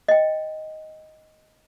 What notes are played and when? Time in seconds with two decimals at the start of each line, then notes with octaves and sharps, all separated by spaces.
0.08 D#5 G5